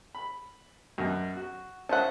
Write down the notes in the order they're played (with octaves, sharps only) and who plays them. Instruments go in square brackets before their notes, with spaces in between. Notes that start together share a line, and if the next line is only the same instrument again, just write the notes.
[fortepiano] B5
F#2 B2
F#4
[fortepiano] C#4 C5 E5 [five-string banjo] F#5 A5